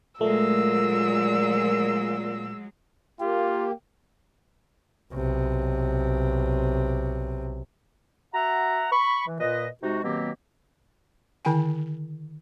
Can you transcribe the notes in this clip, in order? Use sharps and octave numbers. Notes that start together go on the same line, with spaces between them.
A#2 F#3 G#3 A3 E6
A#3 F4 G4
B1 C3
F#4 E5 F#5 A#5
B5 C#6
E3
A#2 B4 D#5
C3 G#3 D#4 F#4
B2 D#3 F#3 A#3 C4 G4
D3 D#3 E4 G5 G#5